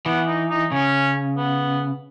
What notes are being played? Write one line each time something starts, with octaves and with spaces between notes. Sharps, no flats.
E3 B3
D#4
D#4
C#3 C#4
B3